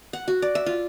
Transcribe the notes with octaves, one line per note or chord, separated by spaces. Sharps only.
F#5
F#4
D5
E5
F4